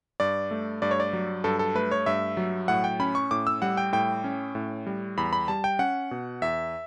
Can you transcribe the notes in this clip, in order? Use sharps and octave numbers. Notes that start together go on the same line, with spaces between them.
G2 D5
A3
G2 D5
C#5
D5
F#3
G2 A4
A4
A3 B4
C#5
G2 E5
F#3
A2 F#5
G5
C#4 B5
C#6
A2 D6
E6
G3 F#5
G5
A2 G5
C#4
A2
G3
E2 B5
B5
G3 A5
G5
C#4 F#5
B2
E2 E5